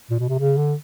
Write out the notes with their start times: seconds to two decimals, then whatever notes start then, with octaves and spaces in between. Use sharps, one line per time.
0.10 A#2
0.19 B2
0.29 C3
0.38 C#3
0.57 D3